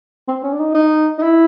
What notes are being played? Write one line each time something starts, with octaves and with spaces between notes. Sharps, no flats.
C4
C#4
D4
D#4
D#4
D#4
E4